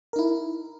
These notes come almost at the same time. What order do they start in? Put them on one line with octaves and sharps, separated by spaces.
A#4 D#4 E4